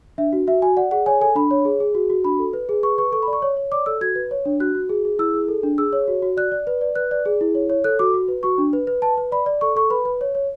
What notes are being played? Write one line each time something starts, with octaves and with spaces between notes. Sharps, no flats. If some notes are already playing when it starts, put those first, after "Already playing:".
D4 E5
F#4
F#4 E5
F#4 G#5
D5 F#5
G#4 F#5
C#5 G#5
A4 G#5
D4 B5
C#5
G#4
G#4
F#4
F#4
D4 B5
A4
B4
G#4
B4 C#6
B4 C#6
A4 C#6
D5 B5
C#6
C#5
C#5
D5 D6
A4 E6
F#4 G#6
B4
C#5
D4
F#4 F#6
F#4
G#4
G#4
E4 E6
G#4
A4
D4
G#4 E6
C#5
F#4
F#4
D5 F#6
D5
B4
D5
B4 F#6
D5
G#4
E4
C#5
C#5
A4 F#6
F#4 D6
F#4
B4
F#4 C#6
D4
B4
B4
B4 A5
B4
D5 B5
D5
A4 C#6
A4 C#6
B4 B5
B4
C#5
C#5